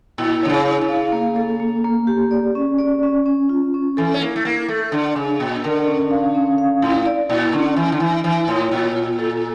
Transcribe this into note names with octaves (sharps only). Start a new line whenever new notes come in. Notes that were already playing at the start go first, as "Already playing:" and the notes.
A#2 E4
D3 C#5
C#3
E4
C#3
F5
A#3
A4
A#3
A#3
G4
D5
C#4
D5
C#4
C#4
F4
C#4
E3 A4
C#4
A#3 E4
A3
A#3 E4
A3 A4
D3 D4
C#3 D4
A#2 D4
D3 A#4
C#4
F5
C#4
F5
A2 E4
D5
A#2 E4
D3 C#4
E3 E4
D3
E3 E4
E3 E4
A2 C#5
A#2 F4
F4
A4